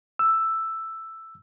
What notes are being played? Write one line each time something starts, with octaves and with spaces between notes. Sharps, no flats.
E6